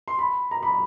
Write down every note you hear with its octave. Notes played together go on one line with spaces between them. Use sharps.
C6
B5
A#5
B5